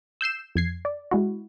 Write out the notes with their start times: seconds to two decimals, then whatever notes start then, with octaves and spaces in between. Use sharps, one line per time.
0.21 E6 G6 C7 E7
0.55 F2 G#6 C7
0.85 D5
1.11 G#3 E4 F#4